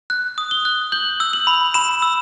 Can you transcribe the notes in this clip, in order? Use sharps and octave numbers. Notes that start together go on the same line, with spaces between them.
F#6
D#6
G7
F#6
G6 F#7
E6
F#7
B5
B5 E7
E6